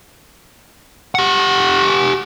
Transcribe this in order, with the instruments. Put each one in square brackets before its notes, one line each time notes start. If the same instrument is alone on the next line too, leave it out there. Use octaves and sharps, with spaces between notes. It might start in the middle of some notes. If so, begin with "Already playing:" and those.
[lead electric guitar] G4 F#5